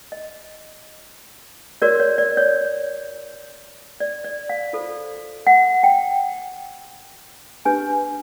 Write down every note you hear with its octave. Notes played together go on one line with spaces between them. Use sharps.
D#5
F#4 A#4 C#5 D5
C#5
D5
C#5
D5
D5
F5
F4 A4 C5
F#5
G5
D4 G4 B4 G#5